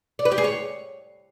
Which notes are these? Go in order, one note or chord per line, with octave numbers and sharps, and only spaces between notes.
D5
B4
G4
G#4
C#5